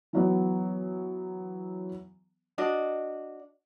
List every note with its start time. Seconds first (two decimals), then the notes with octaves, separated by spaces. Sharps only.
0.13 E3 F#3 B3
2.58 D4 F#4 D#5